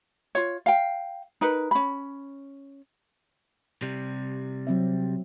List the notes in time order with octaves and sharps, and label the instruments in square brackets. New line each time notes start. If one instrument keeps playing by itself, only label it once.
[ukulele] F4 C#5
F5 G5
D#4 A#4 B4
C#4 B5
[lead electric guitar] C3 G3
[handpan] F#3 C4 E5